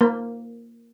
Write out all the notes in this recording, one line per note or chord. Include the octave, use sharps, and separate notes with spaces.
A#3